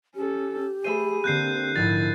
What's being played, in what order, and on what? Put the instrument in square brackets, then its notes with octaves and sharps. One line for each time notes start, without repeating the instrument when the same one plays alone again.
[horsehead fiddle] C#4 A4 [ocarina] G4
[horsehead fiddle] A3 G#4 [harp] C5 E5 B5 [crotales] D#7
[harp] D3 A#3 [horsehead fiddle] C4 [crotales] F#6 G6 C7
[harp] A#1 G#2 [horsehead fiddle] E4 [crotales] A6